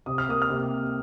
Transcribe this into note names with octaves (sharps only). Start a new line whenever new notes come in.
C3 D#6
F6
A#3 D#6
F6
C3